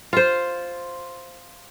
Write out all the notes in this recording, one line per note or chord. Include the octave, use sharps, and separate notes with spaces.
F4 C5